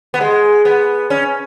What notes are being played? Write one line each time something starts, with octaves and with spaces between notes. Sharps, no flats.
B3
G#3
B3
C#4